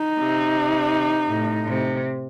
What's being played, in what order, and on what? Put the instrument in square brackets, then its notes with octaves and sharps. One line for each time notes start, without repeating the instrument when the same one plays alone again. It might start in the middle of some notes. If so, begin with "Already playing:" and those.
Already playing: [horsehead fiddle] D#4
[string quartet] C3
A2
C3